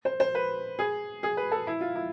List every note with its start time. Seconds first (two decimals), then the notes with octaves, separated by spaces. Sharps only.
0.05 C5
0.20 C5
0.35 B4
0.79 G#4
1.23 G#4
1.37 B4
1.52 A4
1.67 E4
1.81 F4
1.96 E4